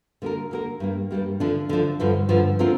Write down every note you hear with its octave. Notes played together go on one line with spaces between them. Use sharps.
D3 A#3 G4 A#4
D3 A#3 G4 A#4
G2 G3 A#3
G2 G3 A#3
D3 F3 D4
D3 F3 D4
G2 D3 F3
G2 D3 F3
D3 F3 C4 F4 A#4